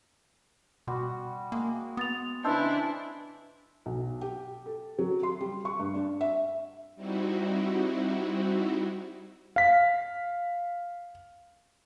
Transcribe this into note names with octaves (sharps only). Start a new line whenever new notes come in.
B2 G3 F#4 C6
G#3 A#3
B3 D#6 A6 F7
C#3 E3 D4 E4 C5 D#5 A5 E6
B1
G4
A4
F#3
C6
G3
C#6
G2
D4
E5
G3 C4 D#4 E4 F#4
F5 B6